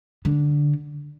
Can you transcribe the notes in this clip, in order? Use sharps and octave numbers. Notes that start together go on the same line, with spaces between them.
D3